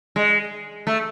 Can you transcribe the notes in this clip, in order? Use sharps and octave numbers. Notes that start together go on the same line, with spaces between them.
G#3
A3